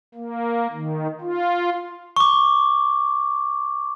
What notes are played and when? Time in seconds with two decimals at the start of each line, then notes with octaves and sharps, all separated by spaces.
0.14 A#3
0.72 D#3
1.21 F4
2.16 C#6 D6